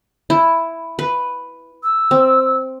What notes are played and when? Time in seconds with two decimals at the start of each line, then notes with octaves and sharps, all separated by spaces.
0.30 E4
0.99 B4
1.84 E6
2.11 C4